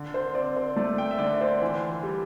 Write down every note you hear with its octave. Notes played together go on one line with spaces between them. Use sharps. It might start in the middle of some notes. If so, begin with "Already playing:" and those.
Already playing: D3
C5
C4 D5
C5
A3 D5
G5
E5
D3 D5
C5
E3
G3